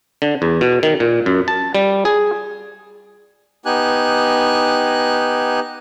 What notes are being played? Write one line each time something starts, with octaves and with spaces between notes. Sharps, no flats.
D3
E2
B2
D#3
A#2
F#2
A5
G3
G#4
B3 D#4 G4 G#5 F#6